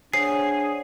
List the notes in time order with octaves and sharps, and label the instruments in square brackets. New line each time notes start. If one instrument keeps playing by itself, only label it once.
[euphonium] D4 [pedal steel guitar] G#4 [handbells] C5 C#5 F#5 [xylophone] C7